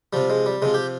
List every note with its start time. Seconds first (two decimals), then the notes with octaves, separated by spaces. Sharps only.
0.13 C3 F3 G3
0.30 G#3
0.46 G3
0.62 C3 F3 G#3
0.74 G4